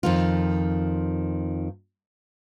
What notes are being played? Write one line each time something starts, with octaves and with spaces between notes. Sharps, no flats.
F2 D#3 F4